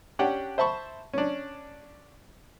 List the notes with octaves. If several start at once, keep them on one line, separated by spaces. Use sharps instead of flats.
C#4 D4 G4 F#5 G5
C5 E5 A5 B5 C#6
C#4 D4